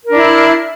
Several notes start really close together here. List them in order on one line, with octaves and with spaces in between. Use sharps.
A#4 D4 E4